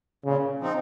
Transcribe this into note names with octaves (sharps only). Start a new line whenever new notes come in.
A#2 C#3
F3 C4 D#4